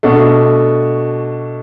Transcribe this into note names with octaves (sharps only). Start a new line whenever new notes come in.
B2 A3 D4 F#4